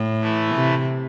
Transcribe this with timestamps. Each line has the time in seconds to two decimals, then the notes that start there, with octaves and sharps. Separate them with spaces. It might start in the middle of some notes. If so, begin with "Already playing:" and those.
Already playing: A2
0.21 E3 A3 E4
0.55 C3